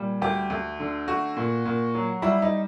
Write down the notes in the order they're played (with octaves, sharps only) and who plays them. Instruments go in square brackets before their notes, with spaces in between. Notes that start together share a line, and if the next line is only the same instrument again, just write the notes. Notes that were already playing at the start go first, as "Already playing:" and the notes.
Already playing: [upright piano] A#2 G3
D2 G4
D2
D3
A3 F#4
A#2
A#2
F#3
G3 E4
D#4